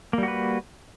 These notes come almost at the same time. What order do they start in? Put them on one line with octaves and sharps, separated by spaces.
A#3 G3 F#4 B4